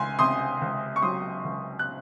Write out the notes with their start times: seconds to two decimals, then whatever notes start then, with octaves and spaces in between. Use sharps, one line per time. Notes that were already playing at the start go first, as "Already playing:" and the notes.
Already playing: C#2 G#5 C6
0.19 C3 C6 D#6
0.61 C#2
0.96 C#6
1.02 F#3 C6 D#6
1.44 C#2
1.79 F#6